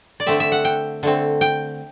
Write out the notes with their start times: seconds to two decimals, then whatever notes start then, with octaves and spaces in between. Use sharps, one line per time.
0.20 D5
0.27 D3 A3 C4 E5
0.40 E5
0.52 F#5
0.65 G5
1.03 D3 A3 C4
1.41 G5